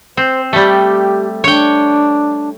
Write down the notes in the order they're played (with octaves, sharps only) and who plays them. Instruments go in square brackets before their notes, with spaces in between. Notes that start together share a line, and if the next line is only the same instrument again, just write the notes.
[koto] C4 [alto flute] C5
[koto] G3 A3 [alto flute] G4
[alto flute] D4 [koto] C#5 G5